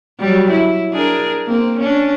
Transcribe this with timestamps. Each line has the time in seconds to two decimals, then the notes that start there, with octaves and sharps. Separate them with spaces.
0.20 F#3 G3
0.50 E4
0.92 D4 G#4 A#4
1.47 A#3 C4
1.79 C#4 D4